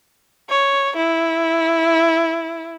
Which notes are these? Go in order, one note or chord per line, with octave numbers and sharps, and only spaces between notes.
C#5
E4